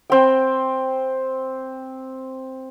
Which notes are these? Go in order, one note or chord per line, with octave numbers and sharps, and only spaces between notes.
C4 G5